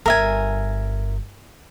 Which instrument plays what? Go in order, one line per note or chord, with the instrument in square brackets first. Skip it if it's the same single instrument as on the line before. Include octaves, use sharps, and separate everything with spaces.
[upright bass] G1 [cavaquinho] A#4 E5 G#5